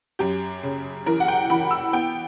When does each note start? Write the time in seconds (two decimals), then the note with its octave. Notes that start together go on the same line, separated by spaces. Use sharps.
0.19 F#2 G4
0.63 C#3
1.06 E3 A#4
1.20 F#5
1.28 G5
1.50 E3 B5
1.71 E6
1.93 B3 G5